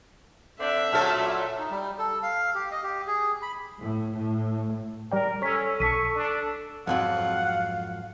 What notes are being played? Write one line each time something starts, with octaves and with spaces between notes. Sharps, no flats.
D3 C4 D4 E5
A#2 F#3 A3 A4 A5 F6
D#4
G3
A4
F5
G4
D#5
G4
G#4
B5
A2
A2
G3 A#4 D5 G5
C#4 A4 C#5 C#6 E6 B6
B1 A5 C#6 B6 D#7
D4
F2 G#2 F#3 F5 F#5